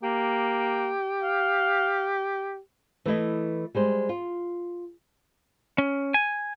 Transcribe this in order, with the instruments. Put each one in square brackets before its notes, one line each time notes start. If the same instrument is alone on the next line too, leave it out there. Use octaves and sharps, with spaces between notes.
[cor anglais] A#3 [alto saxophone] G4
[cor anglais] F5
[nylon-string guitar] E3 A3 E4 D#5
G3 G#3 C5
F4
[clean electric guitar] C#4
G#5